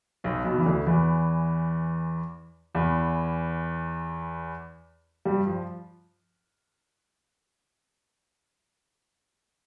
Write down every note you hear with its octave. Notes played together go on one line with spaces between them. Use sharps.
B1 B2
B1 B2
E3
D2 D3
E2 E3
E2 E3
G2 G3
F3